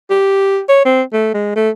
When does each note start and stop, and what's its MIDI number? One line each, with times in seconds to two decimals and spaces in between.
0.10 0.60 67
0.68 0.82 73
0.85 1.02 60
1.13 1.30 57
1.34 1.51 56
1.55 1.70 57